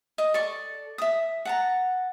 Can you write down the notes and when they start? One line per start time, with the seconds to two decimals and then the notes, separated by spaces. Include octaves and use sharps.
0.18 D#5
0.34 A4 D5 C#6
0.98 E5 D#6
1.45 F#5 A5 A#5